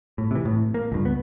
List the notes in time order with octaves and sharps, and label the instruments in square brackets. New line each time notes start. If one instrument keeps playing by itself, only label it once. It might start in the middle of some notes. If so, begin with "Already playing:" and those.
[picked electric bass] A2
C3 E3
A2
A#3
C#2 G2
B3